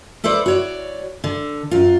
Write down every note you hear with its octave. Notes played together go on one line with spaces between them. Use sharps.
E4 A4 B4 C5 D5
F#4 C#5 D5
D3
F#2 F4